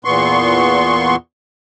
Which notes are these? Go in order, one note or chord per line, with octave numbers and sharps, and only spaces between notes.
E2 A#2 B3 C6 C#6